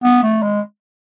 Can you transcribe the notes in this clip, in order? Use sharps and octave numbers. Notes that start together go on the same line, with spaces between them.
B3
A3
G#3